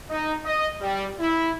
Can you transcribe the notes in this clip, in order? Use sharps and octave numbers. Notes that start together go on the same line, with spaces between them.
D#4
D#5
G3
E4